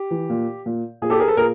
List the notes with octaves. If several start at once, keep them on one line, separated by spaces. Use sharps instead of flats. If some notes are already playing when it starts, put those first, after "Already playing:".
Already playing: G4
E3
A#2
A#2
A#2 G#4
G4 A4
G#4 A#4
A4 B4
A#2 G#4 A#4